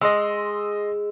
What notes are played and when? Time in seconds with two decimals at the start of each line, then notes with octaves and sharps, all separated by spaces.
0.01 G#3 D#5 C6 E6